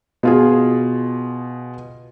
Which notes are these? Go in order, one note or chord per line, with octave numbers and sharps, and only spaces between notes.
B2 F4 G#4